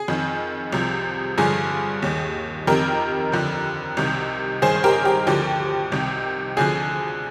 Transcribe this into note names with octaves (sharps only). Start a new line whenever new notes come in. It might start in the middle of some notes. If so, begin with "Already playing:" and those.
Already playing: G#4
F2 D#3
C2 C3 F3
G2 D3 F3 G#4
D#2 D#3
F2 D#3 G4 A#4
F2 D3 F3
C2 C3 D#3
G2 D#3 G#4 C5
G4 A#4
G4
D2 D3 F3 G4
C2 C3 D#3
D2 D3 F3 G#4